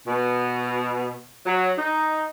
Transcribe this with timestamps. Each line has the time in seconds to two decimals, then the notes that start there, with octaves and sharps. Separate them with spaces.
0.07 B2
1.46 F#3
1.78 D#4